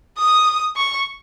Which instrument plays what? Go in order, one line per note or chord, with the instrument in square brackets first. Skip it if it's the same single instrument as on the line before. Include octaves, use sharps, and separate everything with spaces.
[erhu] D#6
C#6